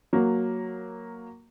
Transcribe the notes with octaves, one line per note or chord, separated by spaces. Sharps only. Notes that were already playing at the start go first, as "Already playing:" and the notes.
F#3 A#3